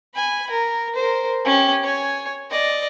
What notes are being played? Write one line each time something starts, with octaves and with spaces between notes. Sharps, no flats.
G#5 B5
A#4
A#4 C5
C#4 G4
C#5 G#5
D5 D#5